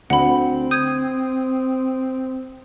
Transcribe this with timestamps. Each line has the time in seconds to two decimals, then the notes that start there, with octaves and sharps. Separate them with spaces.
0.10 D2 C4 F#5 B5
0.71 D#6 G6 G#6